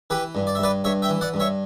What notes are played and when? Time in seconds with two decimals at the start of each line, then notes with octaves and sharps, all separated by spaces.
0.10 E3 G4 B4
0.35 G2
0.47 D5
0.55 E5
0.59 G2 B4 D5
0.84 G2 C#5 E5
1.02 E5 G5
1.09 E3
1.21 D5 F#5
1.34 G2
1.40 C#5 E5